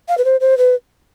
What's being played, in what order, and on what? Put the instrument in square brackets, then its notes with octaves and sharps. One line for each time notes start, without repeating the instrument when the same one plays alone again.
[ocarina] F5
B4
C5
C5
B4